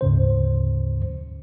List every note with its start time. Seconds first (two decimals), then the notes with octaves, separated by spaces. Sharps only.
0.01 D2 G#2 C#3 C5